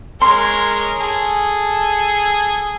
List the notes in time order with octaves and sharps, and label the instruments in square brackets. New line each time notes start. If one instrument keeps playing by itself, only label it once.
[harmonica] G#3 C#4 A#4 [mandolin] C6
[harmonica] G#4 A4